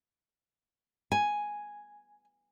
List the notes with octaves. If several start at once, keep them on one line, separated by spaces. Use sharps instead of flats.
G#5